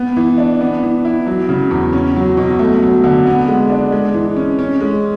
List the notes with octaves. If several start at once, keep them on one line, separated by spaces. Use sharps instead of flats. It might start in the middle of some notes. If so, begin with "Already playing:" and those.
Already playing: B3
E3
D4
B3
E3
E4
F#3
C#3
E2
C#4
F#3
B2
A3
F#3
D3
B3
G#3
D4
G#3
E3
C#4
C#4
G#3